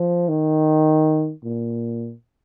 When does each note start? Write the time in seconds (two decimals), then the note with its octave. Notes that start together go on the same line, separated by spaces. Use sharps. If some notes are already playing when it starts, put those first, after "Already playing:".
Already playing: F3
0.29 D#3
1.44 A#2